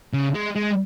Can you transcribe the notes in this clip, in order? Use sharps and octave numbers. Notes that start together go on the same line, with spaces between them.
C#3
G#3
G#3